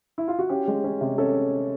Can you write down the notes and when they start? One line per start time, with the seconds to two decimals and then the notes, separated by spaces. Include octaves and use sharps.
0.18 E4
0.28 F4
0.39 F#4
0.49 C#4 G4
0.68 G#3
0.84 C#4
1.01 C3
1.18 C#4 A4